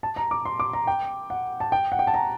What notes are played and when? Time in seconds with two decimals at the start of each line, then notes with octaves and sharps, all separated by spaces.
0.03 A5
0.16 A#5
0.31 D6
0.45 C6
0.60 D6
0.73 A#5
0.87 G5
1.30 F#5
1.60 A5
1.72 G5
1.92 F#5
1.99 G5
2.07 A5
2.14 A#5